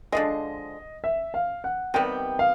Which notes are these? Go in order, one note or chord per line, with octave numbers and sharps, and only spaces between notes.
D3 F3 G#3 D#5
E5
F5
F#5
C3 D#3 G3 B3 G5
F5